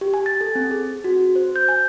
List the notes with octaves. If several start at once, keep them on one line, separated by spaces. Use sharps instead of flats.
G4
G#5
A6
A4
C4
G#4
F#4
C5
G6
G#5